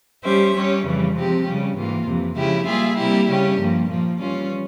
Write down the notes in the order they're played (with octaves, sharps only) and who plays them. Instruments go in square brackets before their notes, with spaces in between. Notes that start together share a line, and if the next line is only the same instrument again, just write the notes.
[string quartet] G3 C#4 G4 C5 E5
G3 C#4 G4 C#5
F2 C#3 E3 G3
C3 F3 G#3 C4 G4
C#3 G3 C#4
G#2 E3 A#3 F4
F2 C3 E3
C#3 F3 G#3 E4 G4
G3 A#3 F4 G#4 E5
C3 G3 A#3 E4 G4
C#3 G3 C#4 G4
G2 F3 A#3
A#2 F3 A#3
E3 G3 C#4 F4